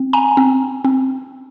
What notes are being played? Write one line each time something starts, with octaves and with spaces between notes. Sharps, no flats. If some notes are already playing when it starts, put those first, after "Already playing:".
Already playing: C4
G#5 A#5
C4
C4